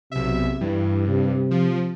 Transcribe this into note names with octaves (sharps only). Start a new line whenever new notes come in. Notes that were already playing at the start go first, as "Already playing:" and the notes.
B1 C3 E5
G2 E3
C3
F3